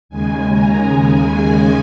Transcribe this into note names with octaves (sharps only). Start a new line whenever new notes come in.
D#2 C#3 G#3 G#5
A#5
D#2 C#3 G#3 G#5